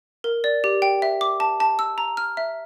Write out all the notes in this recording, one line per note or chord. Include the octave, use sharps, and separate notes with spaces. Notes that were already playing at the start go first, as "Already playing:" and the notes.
A#4
D5
G4
G5
E5
D6
A5
A5
E6
A#5
F6
E5